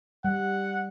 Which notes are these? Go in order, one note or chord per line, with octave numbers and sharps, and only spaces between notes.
G3 F#5